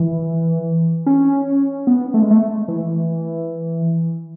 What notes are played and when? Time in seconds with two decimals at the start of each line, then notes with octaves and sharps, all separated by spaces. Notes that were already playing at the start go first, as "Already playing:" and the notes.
Already playing: E3
1.06 C#4
1.87 B3
2.14 A3
2.22 G#3
2.31 A3
2.68 E3